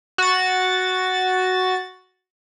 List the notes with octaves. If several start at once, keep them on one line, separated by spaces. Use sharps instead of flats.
F#4 A6